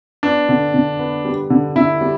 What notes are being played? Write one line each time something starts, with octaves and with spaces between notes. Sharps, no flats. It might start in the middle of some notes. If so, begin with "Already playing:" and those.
B3 D4
D3
D3
B3
G3
D3
D3 E4
G3